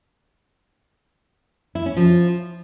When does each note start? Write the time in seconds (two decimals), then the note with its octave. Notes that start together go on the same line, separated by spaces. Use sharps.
1.75 E4
1.86 C#4
1.96 F3